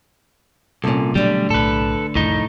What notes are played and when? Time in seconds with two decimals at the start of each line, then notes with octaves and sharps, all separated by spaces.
0.84 C2 A#2 C#4 A4
1.15 B2 D3 F#3 G3 A3
1.50 B1 A2 A4 B4
2.15 C2 F2 A2 D#3 D#4